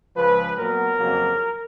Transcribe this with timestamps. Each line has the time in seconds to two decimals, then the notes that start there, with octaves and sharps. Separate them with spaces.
0.16 C#2 C#3 F3 B4
0.57 A#2 F#3 B3 A#4
0.98 F2 C#3 F#3 A#3